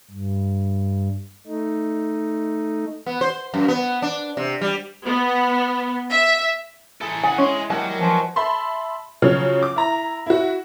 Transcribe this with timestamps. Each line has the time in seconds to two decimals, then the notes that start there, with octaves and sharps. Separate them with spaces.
0.11 G2
1.47 A3 D#4
3.06 B3
3.21 C5
3.54 F#2
3.68 B3
4.02 D4
4.37 C3
4.61 G3
5.06 B3
6.11 E5
7.01 E3 E4 G#4 A4 A#5
7.23 C#3 G#4 F#5 G#5
7.38 G#3 C#4 G#5 C6
7.70 D#3 F#3 G3 A#3 A5
7.99 E3 F3 C#4
8.36 E5 A5 B5 C6
9.22 C#3 F3 F#3 C#5 F6
9.63 D6
9.76 E4 A#5
10.26 E4 F#4